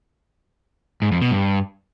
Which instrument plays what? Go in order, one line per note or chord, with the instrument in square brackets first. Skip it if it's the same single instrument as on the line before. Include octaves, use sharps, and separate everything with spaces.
[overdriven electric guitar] G#2
F2
B2
G2